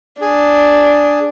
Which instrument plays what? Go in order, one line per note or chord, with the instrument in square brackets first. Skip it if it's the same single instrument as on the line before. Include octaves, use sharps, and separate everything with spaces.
[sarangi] D4 [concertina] G#4